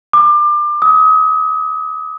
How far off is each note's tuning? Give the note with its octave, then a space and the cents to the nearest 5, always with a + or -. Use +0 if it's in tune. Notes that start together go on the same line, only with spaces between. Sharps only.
D6 +30
D#6 +35